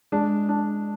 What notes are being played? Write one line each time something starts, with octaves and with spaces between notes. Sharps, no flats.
G#3 D4
D4